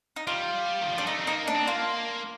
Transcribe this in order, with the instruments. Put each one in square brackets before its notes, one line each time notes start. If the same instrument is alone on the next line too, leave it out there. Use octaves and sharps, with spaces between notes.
[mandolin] D#4
[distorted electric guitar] G3 [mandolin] F4
[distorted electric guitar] D#3
F3
[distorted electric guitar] G3 [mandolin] D4
[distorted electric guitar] A3 [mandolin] D#4
[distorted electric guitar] C4
[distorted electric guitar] A#3 [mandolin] D#4
[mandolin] D4
[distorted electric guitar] C4
[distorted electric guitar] A#3 [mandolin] F4